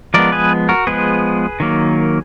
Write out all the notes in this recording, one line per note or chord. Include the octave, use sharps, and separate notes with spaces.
F3 G#3 B3 A#4 D5
G#4 B4
F#4 A#4
F3 G#3 B3 G#4 B4
D#3 F#3 A#3